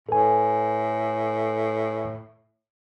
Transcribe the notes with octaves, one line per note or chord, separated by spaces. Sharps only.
A2 A4 B4 G#5